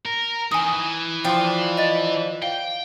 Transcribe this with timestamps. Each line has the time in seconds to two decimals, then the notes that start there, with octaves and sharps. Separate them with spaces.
0.05 A#4
0.52 D#3 E3 G#5 D#6
0.72 E3
1.25 F3 D4 G5 C6
1.77 D#5 A6
2.42 F5 G5